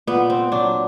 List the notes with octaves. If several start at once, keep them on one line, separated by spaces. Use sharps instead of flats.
A#2 B3
C4
F#3 D4